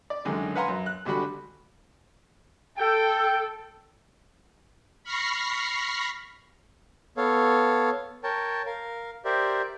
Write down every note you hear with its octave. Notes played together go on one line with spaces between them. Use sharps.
D5
F#2 D3 D#3 G#3 C#4
B4 F5 F#5 G#5 A#5 C6
F#2
F#6
G#1 D3 G3 F#4 B5
A4 G5
B5 C#6 F6 A#6 C7
B3 A4 C#5 F5
A#4 C#5 G5 A5
A#4 F5
G4 A#4 C5 D5 E5